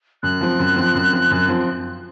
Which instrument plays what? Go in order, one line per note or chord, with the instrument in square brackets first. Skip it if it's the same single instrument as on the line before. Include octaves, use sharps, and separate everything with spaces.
[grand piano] F#2 [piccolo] F#6
[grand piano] F3 C4
F#2
F3 C4
F#2
F3 C4
F#2
F3 C4